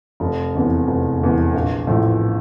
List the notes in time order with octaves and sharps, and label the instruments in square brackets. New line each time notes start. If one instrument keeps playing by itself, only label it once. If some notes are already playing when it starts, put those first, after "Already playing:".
[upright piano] F1
E2 C3
F1
E2 C3
A#1
A2 F3